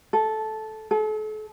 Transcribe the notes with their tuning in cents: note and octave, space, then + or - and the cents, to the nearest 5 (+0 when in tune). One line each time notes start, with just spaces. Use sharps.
A4 -10
A4 -40